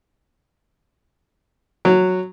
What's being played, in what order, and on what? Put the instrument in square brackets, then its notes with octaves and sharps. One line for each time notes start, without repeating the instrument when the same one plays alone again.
[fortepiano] F#3